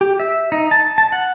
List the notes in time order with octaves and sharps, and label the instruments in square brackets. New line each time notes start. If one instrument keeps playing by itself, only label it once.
[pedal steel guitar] G4
E5
D#4
A5
A5
F#5